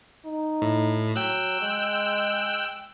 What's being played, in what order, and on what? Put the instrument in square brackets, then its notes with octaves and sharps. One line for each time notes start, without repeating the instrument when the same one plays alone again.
[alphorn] D#4
[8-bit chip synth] A2
[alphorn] F#3 [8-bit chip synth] G5 E6 F#6
[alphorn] G#3